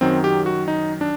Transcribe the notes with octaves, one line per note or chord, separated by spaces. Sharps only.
F#2 D#3 F#3 C4
G4
F#4
D#4
D4